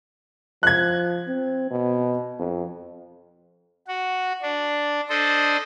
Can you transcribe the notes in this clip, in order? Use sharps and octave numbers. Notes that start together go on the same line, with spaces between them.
F3 F#6 G#6
C4
B2
F2
F#4
D4
D4 A4 C5 D#5